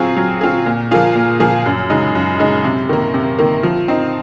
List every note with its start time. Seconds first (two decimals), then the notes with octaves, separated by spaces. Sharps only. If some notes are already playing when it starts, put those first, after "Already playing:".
Already playing: F#3 C4 F4 G#4
0.17 F#3
0.41 C4 F4 G#4
0.66 A#2
0.91 F3 A#3 F4 G#4
1.15 A#2
1.40 F3 A#3 F4 G#4
1.66 F#2
1.90 C#3 G#3 D#4
2.15 F#2
2.39 C#3 G#3 D#4
2.64 C3
2.89 D#3 A#3
3.14 C3
3.39 D#3 A#3
3.63 F3
3.88 C4 D#4